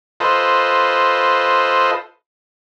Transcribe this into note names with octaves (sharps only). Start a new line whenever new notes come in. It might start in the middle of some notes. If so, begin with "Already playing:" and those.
F4 A4 B4 C5 D#5